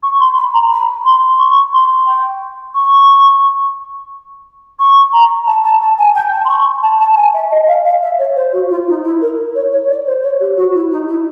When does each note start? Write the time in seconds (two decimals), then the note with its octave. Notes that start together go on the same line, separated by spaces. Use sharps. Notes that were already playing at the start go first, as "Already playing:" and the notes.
0.03 C#6
0.20 C6
0.36 B5
0.53 A#5
0.71 B5
1.05 C6
1.38 C#6
1.73 C6
2.06 G5
2.74 C#6
4.79 C#6
5.12 A#5
5.47 A5
5.64 A5
5.81 A5
5.98 G#5
6.15 G5
6.32 A5
6.45 C6
6.49 C#6
6.83 A5
7.00 A5
7.13 A5
7.16 G#5
7.34 E5
7.51 D#5
7.68 F5
7.85 F5
8.02 E5
8.18 C#5
8.36 C5
8.53 F#4
8.70 F4
8.87 D#4
9.04 E4
9.21 A#4
9.55 C#5
9.71 C#5
9.88 D5
10.06 C5
10.23 C#5
10.40 G4
10.57 F#4
10.74 E4
10.91 D#4
11.08 E4